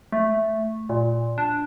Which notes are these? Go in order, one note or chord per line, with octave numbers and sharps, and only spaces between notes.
A3
A#2
D4